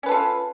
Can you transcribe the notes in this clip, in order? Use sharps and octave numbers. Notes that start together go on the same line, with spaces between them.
C#4 F4 A4 B4